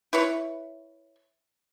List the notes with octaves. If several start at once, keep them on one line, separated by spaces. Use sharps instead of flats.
E4 B4 C#5